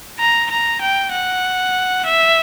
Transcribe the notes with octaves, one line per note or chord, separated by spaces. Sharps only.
A#5
A#5
G5
F#5
E5